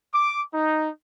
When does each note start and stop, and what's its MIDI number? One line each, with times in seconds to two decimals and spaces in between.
0.13 0.40 86
0.54 0.89 63